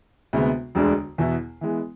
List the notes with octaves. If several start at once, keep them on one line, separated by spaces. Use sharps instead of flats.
D2 C3 G#3 B3
E1 D2 D3 G#3 D4
E2 B2 B3 E4
E3 G#3 B3